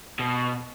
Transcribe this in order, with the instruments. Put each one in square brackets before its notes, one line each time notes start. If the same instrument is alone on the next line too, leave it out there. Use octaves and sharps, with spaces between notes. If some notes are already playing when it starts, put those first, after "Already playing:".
[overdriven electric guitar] B2